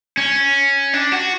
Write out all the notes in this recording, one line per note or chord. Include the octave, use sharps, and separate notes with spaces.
C#4
D4
F#4